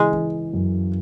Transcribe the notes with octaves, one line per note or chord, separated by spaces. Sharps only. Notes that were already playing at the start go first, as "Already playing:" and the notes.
Already playing: C#3 E3 G#3
E3
F#2